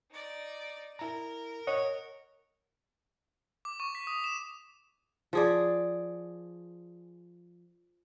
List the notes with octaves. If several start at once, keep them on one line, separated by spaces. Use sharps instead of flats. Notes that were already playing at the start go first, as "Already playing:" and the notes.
D#4 D5
E4 A#4 A#5
C#5 D#5 F#5
D6
C#6
B6
D#6
E7
F3 G#4 D5